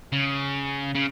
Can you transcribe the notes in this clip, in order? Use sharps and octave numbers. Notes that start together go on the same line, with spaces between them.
C#3
C#3